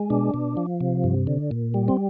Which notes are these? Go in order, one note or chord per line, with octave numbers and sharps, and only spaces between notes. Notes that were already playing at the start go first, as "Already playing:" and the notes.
Already playing: G#3
B2 D4
B2
F3
C3
G2
D3
A#2
G3
C4